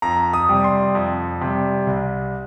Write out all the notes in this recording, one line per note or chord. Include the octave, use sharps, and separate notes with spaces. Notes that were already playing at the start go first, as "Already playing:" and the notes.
F2 A#5
D#6
C3 G3
C6
F2
C3 G3
C2